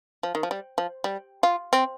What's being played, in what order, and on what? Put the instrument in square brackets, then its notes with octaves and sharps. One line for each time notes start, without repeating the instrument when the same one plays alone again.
[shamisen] F3
D#3
F3
G3
F3
G3
F4
C4